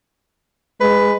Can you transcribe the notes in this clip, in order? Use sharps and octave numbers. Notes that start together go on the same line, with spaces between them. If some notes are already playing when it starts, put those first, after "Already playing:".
G#3 B4